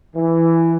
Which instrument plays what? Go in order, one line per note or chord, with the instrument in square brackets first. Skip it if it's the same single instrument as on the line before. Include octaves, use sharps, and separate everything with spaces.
[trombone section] E3